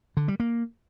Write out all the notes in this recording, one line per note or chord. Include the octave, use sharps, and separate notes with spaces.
D3
G3
A#3